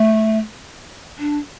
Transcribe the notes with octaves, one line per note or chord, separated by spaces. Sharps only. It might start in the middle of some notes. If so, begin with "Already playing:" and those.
Already playing: A3
D4